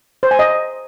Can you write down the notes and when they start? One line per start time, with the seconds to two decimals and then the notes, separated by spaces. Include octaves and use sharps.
0.23 C5
0.31 G#5
0.39 D#5